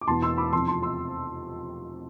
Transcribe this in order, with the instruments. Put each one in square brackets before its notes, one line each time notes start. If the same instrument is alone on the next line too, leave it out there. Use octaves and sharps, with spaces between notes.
[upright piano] D6
E1 E2 B2 B3 A5 C6
C6 E6
B5 D6
F2 C3 F3 A5 C6
A5 C6
C6 E6